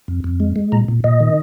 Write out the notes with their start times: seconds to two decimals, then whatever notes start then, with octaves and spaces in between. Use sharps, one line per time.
0.08 F2
0.24 F2
0.40 G#3
0.56 G#3
0.72 A#2 A#5
0.88 A#2
1.04 A#2 D#5
1.20 D#3